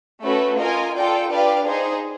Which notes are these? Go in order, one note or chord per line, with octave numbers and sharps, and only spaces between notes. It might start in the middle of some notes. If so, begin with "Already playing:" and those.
A3 C#4 F#4 B4
F4 A#4 D#5 G#5
F4 A4 D5 G5
D4 G4 B4 D5 F5
D#4 G#4 C5